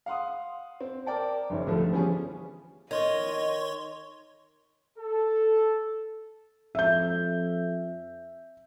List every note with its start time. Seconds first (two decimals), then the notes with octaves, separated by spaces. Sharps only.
0.06 F5 F#5 C6 D#6
0.81 C4
1.06 A#4 D5 G5 A5
1.50 F#1 D#3 C#5
1.66 C2 D3 F3 A3 A4
1.92 E3 F3 G3 B3 C#4 G#4
2.91 D#3 C#5 D#5 C6 C#6
4.99 A4
6.75 F2 E5 G6